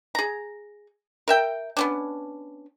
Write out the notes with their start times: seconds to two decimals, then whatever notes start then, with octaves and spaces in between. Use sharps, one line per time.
0.15 G#4 A#5
1.28 A#4 E5 G5
1.77 B3 C#4 D4